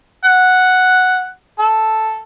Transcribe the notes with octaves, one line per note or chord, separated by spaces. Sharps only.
F#5
A4